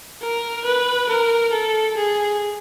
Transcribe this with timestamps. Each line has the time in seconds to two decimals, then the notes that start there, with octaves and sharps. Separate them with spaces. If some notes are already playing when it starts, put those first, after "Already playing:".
0.22 A#4
0.65 B4
1.09 A#4
1.53 A4
1.97 G#4